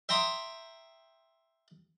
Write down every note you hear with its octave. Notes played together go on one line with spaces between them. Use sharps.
E5 G5 A#5 C6 D#6